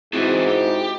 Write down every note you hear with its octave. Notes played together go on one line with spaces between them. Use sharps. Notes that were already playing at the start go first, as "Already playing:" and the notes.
G#2 C3 E3 E4 F#4 G#4
G4